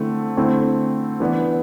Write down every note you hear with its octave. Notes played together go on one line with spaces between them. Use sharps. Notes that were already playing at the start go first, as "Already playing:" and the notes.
Already playing: D3 A3 C4 E4
D3 A3 C4 E4
E3 B3 D4